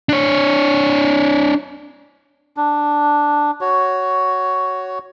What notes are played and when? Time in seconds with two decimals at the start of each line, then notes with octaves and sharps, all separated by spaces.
0.09 D4 C#5
2.57 D4
3.61 F#4 C#5